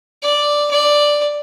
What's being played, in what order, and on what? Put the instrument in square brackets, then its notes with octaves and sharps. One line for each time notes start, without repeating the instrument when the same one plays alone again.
[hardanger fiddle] D5
D5